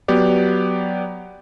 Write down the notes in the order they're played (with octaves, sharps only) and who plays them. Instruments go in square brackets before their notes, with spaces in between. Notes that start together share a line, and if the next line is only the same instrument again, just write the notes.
[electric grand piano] F#3 B3 G4 D5